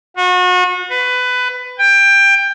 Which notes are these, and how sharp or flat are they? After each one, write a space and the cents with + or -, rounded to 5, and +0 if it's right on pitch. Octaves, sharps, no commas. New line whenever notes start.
F#4 -35
B4 +20
G5 +20